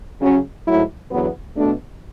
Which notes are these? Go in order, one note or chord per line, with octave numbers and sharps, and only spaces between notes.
C#3 F#3 C#4
G#2 F#3 A3 E4
E2 D3 F#3 B3
B2 A3 D4